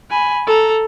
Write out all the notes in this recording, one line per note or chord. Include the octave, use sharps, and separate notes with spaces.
G#5 B5
A4 A#5